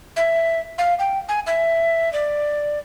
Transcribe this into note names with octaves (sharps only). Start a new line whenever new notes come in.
E5
F5
G5
G#5
E5
D5